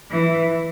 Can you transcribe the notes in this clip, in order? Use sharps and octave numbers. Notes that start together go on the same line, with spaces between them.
E3